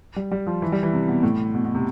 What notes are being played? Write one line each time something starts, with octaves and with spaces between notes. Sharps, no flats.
G3
G3
F3
E3
G3
E3
C3
B2
A2
B2
B2
C3